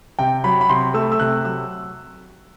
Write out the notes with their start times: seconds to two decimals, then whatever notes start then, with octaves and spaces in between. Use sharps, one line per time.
0.19 C3 G5
0.44 F#3 B5
0.61 B5
0.69 C3 C6
0.94 A3 E6
1.12 E6
1.20 C3 F#6
1.45 F#3 E6